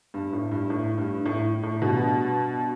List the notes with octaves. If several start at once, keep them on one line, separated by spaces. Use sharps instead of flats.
G2
A2
G2
A2
G2
A2
A2
G2 B2